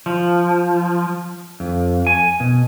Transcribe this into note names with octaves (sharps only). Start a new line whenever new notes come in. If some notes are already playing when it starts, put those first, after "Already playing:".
F3
F2
G#5
B2